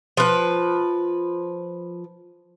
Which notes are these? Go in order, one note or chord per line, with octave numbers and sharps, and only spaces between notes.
F3 B4